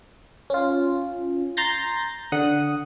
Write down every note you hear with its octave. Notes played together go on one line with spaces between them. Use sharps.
C#4 F4
A#5 C6 G6 A6 A#6
D3 F#5 D#6